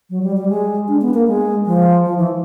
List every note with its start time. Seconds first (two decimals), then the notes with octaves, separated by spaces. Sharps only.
0.10 F#3
0.23 G3
0.36 G3
0.49 G#3
0.88 D4
1.01 B3
1.14 A#3
1.27 G#3
1.66 F3
2.05 F3
2.18 E3